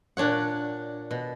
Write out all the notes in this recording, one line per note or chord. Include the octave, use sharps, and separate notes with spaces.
A#2 D4 C#5 F#5
B2